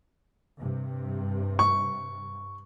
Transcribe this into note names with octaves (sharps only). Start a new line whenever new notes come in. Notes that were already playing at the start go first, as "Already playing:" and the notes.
G2 C3
C#6